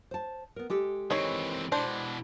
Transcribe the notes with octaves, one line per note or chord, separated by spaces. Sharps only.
C5 A5
B3 A#4
G#3 G4 A4
D#3 E3 C4 C#5
B2 E3 D4 C5